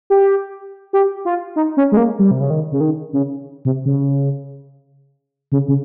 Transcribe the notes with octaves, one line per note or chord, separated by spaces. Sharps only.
G4
G4
F4
D#4
C#4
G#3
A#3
G3
C3
C#3
D#3
C#3
D#3
C#3
C3
C#3
C#3
C#3